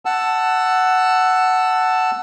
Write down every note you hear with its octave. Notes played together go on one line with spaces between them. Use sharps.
F#5 A5 E6